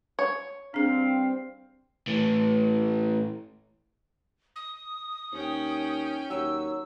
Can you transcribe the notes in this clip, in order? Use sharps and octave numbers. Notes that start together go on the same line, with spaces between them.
C#5
G2 G3 C4 D4 G#4 F5
A2 E3
D#6
D#2 C#4 G5
D#2 F#3 E6